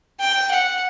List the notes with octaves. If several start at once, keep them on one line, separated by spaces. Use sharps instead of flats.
G5
F#5